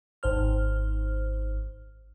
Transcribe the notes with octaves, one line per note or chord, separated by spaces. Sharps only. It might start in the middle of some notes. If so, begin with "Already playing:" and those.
G#1 C5 F6